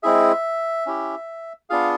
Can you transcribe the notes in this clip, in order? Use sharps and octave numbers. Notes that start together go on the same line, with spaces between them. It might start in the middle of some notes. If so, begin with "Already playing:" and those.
G#3 C4 E4 G#4 E5
C#4 E4 G4
B3 D4 F4 G#4 F5